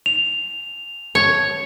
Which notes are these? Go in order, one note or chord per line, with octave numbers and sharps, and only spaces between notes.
F7
C#5